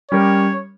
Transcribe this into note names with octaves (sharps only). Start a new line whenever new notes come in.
G3 C#4 G4 A#4 C#5